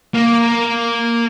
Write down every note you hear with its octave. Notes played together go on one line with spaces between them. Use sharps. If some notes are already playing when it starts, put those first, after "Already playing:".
A#3